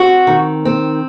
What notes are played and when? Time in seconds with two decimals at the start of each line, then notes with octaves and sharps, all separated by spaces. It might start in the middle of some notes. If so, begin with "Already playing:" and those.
Already playing: C4 F#4
0.27 D#3
0.65 C4